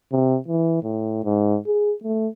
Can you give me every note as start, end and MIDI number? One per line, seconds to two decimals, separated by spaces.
0.12 0.38 48
0.48 0.78 52
0.83 1.19 45
1.25 1.57 44
1.67 1.93 68
2.04 2.28 57